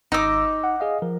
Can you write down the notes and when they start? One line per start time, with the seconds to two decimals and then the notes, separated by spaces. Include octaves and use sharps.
0.12 G#1 D#4 D6 E6 A#6
0.64 F#5
0.80 G#4 D#5 F5
1.02 F3 A#4